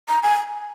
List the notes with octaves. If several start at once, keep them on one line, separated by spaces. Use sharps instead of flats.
A#5
G#5